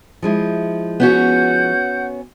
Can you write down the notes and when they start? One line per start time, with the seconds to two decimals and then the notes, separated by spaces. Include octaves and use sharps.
0.22 F3 G#3 E4
1.00 B3 C#4 F#4 F#5 G6